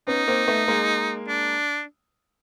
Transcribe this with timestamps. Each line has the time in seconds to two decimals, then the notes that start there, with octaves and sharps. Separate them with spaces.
0.07 B3 C#4 D#4
0.28 A#3 C4
0.47 A3 B3
0.68 G#3 A#3
1.28 D4